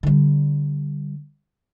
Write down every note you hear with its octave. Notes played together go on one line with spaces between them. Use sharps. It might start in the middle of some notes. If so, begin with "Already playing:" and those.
D3 G3